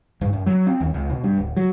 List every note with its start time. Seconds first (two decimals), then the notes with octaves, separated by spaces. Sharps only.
0.21 G2
0.33 F#2
0.46 F#3
0.67 C4
0.81 D#2
0.94 C#2
1.10 B2
1.23 G2
1.38 D1
1.57 F#3